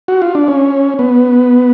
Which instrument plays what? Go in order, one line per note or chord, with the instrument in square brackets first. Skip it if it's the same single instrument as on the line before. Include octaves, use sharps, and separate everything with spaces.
[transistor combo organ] F#4
F4
D4
C#4
B3